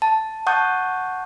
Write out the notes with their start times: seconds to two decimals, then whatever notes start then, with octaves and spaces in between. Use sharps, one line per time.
0.02 A5
0.47 F#5 A5 C#6 D#6 G6